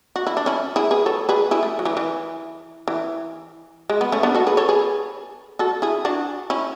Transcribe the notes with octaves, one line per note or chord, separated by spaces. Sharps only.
F#4
E4
D4
C#4 E4
E4 G#4
G#4 B4
A4 C#5
G#4 B4
E4 G#4
A3
F#3
E3
E3
E3
G#3
B3
A3 C#4
B3 D4
F#4 A4
G#4 B4
A4 C#5
G#4 B4
F#4 A4
E4 G#4
D4 F#4
C#4 E4